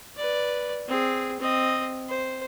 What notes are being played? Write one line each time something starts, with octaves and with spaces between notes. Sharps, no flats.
B4 D5
C4 G#4
C4 D#5
C5